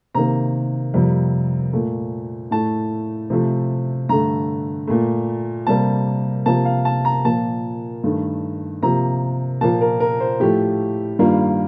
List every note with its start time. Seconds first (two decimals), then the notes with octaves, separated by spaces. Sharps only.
0.15 C3 D#3 A#3 A#5
0.94 F2 C3 G3 A#3
1.73 A#2 A3
2.51 A2 A3 A5
3.30 C3 F3 A3
4.09 G2 D3 A3 A#5
4.87 A#2 A3
5.67 C3 G3 A#3 A5
6.46 C3 F3 A#3 A5
6.65 F5
6.85 A5
7.05 A#5
7.25 A#2 F3 A#3 A5
8.04 G2 D#3 A3
8.83 C3 F3 A#3 A#5
9.61 A#2 F3 A#3 A5
9.81 A#4
10.00 A#4
10.20 C5
10.40 A2 F3 A3 G4
11.19 G2 D#3 G3 A#3 F4